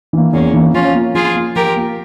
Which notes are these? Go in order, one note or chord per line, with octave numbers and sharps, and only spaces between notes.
E3 A#3
E2 A#3 C#4
E3 A#3
F3 C#4 F4
A#3 F4
F3 F4 G#4
A#3 F4
F3 G4 A#4
A#3 F4